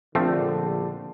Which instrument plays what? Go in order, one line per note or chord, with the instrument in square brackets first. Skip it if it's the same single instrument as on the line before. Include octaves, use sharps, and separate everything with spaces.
[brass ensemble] A#1 D3 [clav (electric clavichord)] F3 A3 C4